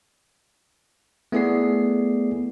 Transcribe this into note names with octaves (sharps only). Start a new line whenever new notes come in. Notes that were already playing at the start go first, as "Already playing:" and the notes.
A3 B3 E4 G#4 D5 C7